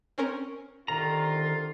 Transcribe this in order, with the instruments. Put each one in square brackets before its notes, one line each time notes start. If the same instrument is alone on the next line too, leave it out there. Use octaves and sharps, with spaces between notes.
[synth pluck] C4 C#4 A#4
[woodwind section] C2 D3 F4 [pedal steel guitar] D#3 A#5